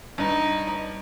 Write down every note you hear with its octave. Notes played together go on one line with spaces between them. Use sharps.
G2 D#4